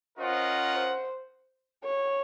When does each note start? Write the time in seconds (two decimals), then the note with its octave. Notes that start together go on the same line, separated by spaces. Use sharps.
0.18 C#4 F4 A#4 C5 D#5 F#5
0.74 C5
1.85 C#5